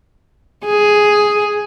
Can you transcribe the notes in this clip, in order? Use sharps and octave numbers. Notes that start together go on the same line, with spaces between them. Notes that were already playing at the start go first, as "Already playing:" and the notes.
G#4